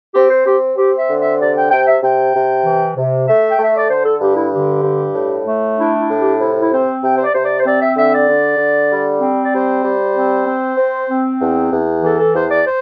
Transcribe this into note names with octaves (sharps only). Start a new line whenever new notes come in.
C4 G4
C5
C4 G4
C4 G4
E5
D3
E5
C3 D5
G5
C3 G5
E5
C3 G5
C3
E3
C3
A3 E5
G5
A3 E5
D5
D3 C5
A4
G2 G4
E4
D3 G4
G2
A2
A3
D4 E4
E4
A2
G4
C3 E4
E4
C4 C5
C3 G5
C5
D5
C3 C5
D5
C5
C4 D5
E5
D3 E5
D5
D3
D3
G3
C4
D5
G3 C5
G3
C4
C4
C4
C4
E2
E2
E3 A4
A4
E2 C5
D5
C5